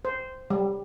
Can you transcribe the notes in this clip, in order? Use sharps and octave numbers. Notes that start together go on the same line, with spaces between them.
C5
G3